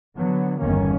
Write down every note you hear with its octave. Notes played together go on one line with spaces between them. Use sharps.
D3 F#3 B3
G1 E2 D#3 A#3 C#4